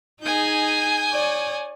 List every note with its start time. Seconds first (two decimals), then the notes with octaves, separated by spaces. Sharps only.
0.22 D#4 G#4 G#5 D#6 G6
1.11 C#5 D5